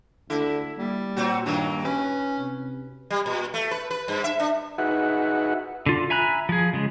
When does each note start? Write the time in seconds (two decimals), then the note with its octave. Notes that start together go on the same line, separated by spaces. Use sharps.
0.30 D2 D3 E4
0.78 G3 A#3
1.17 A#2 F#3 C4 F#4
1.46 G2 D#3 F#3 A#3
1.85 C#4 B4
2.38 C3
3.10 G3
3.26 A#2
3.54 A3
3.71 B4
3.91 B4
4.08 G2
4.24 E5
4.40 D4
4.78 D#4 F#4 G#4 B4 E5 F#5
5.86 D3 F4
6.10 E5 G#5 A#5 B5 F#6
6.49 F3 G#4
6.74 C#3 G#3